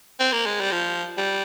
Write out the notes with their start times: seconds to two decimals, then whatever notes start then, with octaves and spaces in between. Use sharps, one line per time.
0.20 C4
0.33 A#3
0.46 G#3
0.60 G3
0.72 F3
1.18 G3